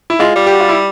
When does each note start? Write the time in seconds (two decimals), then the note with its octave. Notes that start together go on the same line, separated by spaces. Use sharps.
0.10 E4
0.20 G#3 F4
0.36 G3
0.46 G4
0.52 F#4
0.61 F4
0.69 E4